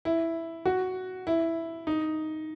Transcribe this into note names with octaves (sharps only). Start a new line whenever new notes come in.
E4
F#4
E4
D#4